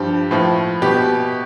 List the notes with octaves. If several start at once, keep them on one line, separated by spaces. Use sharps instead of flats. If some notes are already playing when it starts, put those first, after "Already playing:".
Already playing: G2 F3 G4
A2 F3
B2 G3 G4